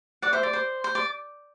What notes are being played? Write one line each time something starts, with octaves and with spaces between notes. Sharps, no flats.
D5 F#5
C5 E5
D5
C5
C5
D5